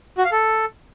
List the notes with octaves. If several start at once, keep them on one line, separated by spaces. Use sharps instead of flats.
F#4
F5
A4